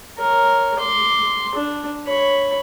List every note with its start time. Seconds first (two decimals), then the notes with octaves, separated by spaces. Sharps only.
0.18 A#4 C#5
0.78 C6 D6
1.55 D4
2.06 C#5 B5